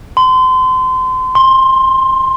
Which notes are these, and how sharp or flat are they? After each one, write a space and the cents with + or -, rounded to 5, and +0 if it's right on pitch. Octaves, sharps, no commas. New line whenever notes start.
C6 -30
C6 +15